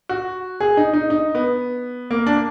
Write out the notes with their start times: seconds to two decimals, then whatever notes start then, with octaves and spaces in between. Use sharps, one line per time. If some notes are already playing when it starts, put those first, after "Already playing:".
0.09 F#4
0.60 G#4
0.77 D#4
0.93 D#4
1.10 D#4
1.35 B3
2.11 A#3
2.26 D4